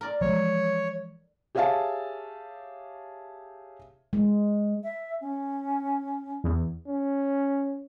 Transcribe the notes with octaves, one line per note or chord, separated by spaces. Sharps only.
A#4 D5
E3 F3 G#3 C#5
G4 G#4 C#5 E5 F5 A5
G#3
E5
C#4
E2
C#4